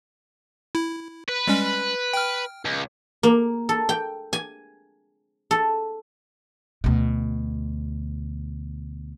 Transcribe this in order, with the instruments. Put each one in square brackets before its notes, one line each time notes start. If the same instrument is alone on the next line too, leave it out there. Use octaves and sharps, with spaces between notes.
[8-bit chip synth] E4
[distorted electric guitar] B4
[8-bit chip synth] G3 G#3 C#4
G5 F6
[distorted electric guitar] C#2
[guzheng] A#3
A4
G5
G#5
A4
[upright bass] D2 B2